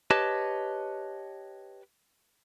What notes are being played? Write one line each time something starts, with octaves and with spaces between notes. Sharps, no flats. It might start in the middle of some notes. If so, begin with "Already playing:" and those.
G4 B4 C#5 D#5 A5